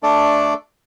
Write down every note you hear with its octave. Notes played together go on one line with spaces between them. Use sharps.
A3 D4 A4 D5